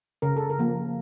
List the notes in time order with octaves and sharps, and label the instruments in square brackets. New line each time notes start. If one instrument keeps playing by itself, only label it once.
[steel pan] C#3 A#4
A4
A#4
F3 A#3